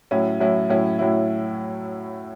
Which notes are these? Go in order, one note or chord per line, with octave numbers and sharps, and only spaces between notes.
A2 F#3 C#4 E4
A2 F#3 C#4 E4
A2 F#3 C#4 E4
A2 F#3 C#4 E4